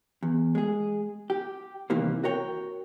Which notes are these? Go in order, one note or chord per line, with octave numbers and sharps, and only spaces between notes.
E2
G#3 G#4
G4
C3 D#3 E3 G3 A#3 C4
F#4 A#4 C#5 G5